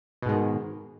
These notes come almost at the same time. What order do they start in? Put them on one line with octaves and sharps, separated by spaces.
B2 G#2 G#3 D#3